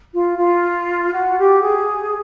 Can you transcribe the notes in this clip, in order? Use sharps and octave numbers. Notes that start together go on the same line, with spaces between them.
F4
F4
F#4
G4
G#4